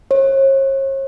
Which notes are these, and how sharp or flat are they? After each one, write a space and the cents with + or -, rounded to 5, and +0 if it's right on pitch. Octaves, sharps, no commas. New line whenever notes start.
C#5 -40